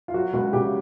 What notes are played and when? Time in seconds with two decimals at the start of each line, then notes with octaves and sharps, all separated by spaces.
0.08 F4
0.14 F#3 F#4
0.33 C#2 F#4
0.53 C#3 G4